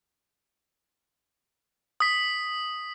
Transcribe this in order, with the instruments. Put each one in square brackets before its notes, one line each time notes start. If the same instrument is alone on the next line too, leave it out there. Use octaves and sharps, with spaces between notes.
[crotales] D#6 B6